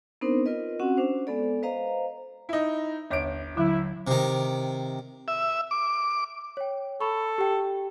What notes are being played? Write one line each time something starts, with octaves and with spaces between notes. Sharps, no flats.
B3 C4 D4 D#4 A#4 C5
F4 A#4 B4 D#5
C4 C#4 F#4 F#5
C#4 D4 C5
G#3 B3 A4 D5
B4 C5 D#5 F5 A#5
D#4 E4
G1 D#2 C#5 D6 D7
D3 F#3 E4 F5
C3 D#3
E5
D6
C#5 G5
A4 B5 C#6
G4 G5